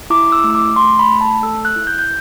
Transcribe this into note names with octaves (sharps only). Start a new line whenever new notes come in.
E4 D6
E6
A3
D6
A3 C6
B5
A3
A5
A4 E6
F#6
E4
G6
G6